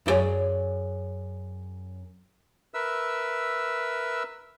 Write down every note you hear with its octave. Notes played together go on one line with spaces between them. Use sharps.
F#2 E4 G#4 C#5 D5
A#4 B4 E5 E6